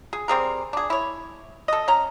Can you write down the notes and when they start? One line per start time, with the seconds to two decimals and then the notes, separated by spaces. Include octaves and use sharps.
0.13 G#4
0.28 G3 C4 G#4 A#4
0.73 D4 G#4
0.90 E4 C#5
1.68 A4 D#5
1.88 C#4 A#5